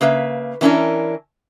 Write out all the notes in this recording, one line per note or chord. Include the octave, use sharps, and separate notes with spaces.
C#3 A#3 B4 E5
E3 B3 C#4 D4 E4 A#4